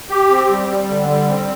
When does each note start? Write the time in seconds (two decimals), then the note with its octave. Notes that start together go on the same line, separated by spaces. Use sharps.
0.09 G4
0.29 C4
0.50 G3
0.68 G3
0.89 D3
1.08 G3
1.28 C4